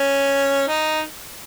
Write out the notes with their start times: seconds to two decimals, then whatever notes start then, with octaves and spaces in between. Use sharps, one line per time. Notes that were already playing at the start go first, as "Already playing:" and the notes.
Already playing: C#4
0.68 D#4